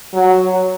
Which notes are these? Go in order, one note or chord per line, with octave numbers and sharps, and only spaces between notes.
F#3